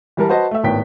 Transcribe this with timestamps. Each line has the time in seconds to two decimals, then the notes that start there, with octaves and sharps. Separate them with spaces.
0.17 E3 G3 A#4 A5
0.29 F#4 B4 C5 D#5 A5
0.51 A3 E5
0.63 G#1 A2 B3 G5 B6